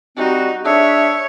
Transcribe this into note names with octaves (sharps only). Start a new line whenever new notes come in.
G3 C4 D#4 F#4
D4 G#4 C#5 E5